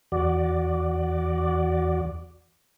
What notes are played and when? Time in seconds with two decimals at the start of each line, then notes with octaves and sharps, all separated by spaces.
0.12 E2 F#4 D5